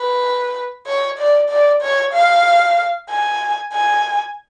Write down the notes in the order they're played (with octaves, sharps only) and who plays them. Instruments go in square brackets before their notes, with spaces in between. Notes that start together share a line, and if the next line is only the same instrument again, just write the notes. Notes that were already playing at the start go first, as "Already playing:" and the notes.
Already playing: [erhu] B4
C#5
D5
D5
C#5
F5
G#5
G#5